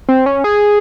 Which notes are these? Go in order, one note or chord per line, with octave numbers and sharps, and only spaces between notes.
C4
C#4
G#4